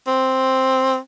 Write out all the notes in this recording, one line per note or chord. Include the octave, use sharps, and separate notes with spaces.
C4